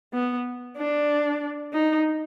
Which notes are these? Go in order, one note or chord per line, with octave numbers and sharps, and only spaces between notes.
B3
D4
D#4